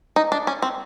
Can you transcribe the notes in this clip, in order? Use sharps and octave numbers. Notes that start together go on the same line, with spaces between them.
D#4
D4
C#4
C4